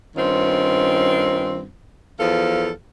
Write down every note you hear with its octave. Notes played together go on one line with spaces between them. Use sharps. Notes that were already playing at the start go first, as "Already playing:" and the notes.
G2 D#3 C4 C#4 F4
E2 F3 A4 F5